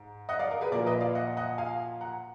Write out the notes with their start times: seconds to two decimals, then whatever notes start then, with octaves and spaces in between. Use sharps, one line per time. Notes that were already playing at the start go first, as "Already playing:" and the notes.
Already playing: G#2
0.29 D#5 F#5
0.39 D5 F5
0.51 A#4
0.61 G#4 B4
0.72 A#2 A#4 D5
0.75 F3
0.86 B4 D#5
1.01 D5 F5
1.15 D#5 F#5
1.37 D#5 F#5
1.58 F5 G#5
2.01 F#5 A#5